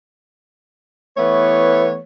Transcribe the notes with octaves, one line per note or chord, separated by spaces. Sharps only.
E3 A3 B3 C#5